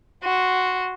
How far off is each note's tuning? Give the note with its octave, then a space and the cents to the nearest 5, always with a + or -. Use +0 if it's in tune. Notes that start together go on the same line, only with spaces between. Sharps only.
F#4 +0 C6 +0